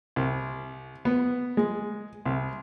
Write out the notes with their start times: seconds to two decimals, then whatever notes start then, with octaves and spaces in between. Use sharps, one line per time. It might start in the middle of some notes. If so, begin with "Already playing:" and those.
0.16 C2
1.05 B3
1.57 G#3
2.25 C2